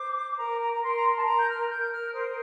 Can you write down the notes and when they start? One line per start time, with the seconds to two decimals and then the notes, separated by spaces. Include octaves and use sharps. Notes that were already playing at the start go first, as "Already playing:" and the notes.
Already playing: C5 D6
0.38 A#4 A#5
0.59 A#5
0.72 A#5
0.82 A#4 C6
0.94 A#5
1.04 C6
1.16 A5
1.26 A#4 A#5
1.39 G6
1.48 F6
1.69 A#4 G6
1.91 F6
2.13 C5 D#6